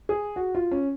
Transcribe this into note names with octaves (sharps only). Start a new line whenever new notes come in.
G#4
F#4
F4
C#4